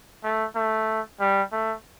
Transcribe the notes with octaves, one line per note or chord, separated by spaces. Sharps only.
A3
A3
G3
A3